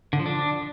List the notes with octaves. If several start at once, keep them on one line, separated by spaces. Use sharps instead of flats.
D3
F3
D4